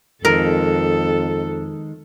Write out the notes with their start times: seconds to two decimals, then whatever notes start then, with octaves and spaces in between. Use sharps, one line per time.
0.25 F2 D#3 G#3 A4 A#4